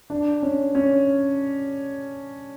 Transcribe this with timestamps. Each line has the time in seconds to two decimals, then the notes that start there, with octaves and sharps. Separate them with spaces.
0.10 D4
0.43 C#4
0.75 C#4